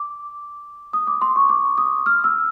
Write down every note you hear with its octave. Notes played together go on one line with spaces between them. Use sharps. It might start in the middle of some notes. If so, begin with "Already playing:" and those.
Already playing: D6
D#6
D6
C6
C#6
D6
D#6
F6
E6